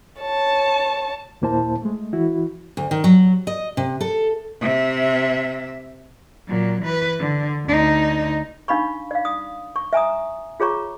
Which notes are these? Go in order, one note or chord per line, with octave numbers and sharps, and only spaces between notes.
C#5 A5
D#2 A#2 A#3 E4 C5 A5
G#3 A3
E3 E4 F#4
D2
D#3
F#3
D#5
C3
A4
C3 E5
A#2 F#3
E3 B4
D3
D2 D#4
D4 D#4 F5 B5 C#6
D5 F5
D#6
C#6
E5 G#5 A#5 D#6
F4 G#4 C#5 A#5 C#6